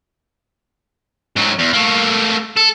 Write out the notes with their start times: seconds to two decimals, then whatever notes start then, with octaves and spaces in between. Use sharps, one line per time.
1.36 G#2 F#3
1.59 E2
1.73 A3 A#3
2.57 A4